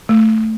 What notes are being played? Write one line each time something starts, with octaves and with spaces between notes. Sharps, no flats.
A3